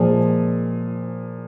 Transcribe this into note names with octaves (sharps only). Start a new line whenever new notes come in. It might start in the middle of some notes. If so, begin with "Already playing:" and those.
Already playing: A#2 F3 G#3